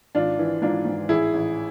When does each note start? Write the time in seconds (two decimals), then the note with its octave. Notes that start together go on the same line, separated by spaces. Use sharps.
0.15 G#1 D4 F4
0.39 E3
0.62 G#2 D4 F4
0.85 G#2
1.09 A1 E4 G#4
1.34 A1